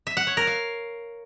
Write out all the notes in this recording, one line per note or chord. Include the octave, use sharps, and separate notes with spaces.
E5
F#5
C#5
A#4
F5